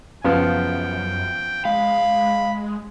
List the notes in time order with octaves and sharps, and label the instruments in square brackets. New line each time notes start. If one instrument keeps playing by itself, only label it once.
[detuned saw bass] F#2 [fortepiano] C#3 F3 B3 [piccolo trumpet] G5
[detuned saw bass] G#3 [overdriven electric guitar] F5 [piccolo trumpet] B5